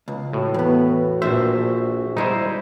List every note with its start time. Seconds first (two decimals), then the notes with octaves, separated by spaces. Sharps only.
0.08 C#2
0.33 A2 F#4
0.54 E2 B3
1.22 A#1 C5 E5
2.17 G#2 G3 D#4 E4 C5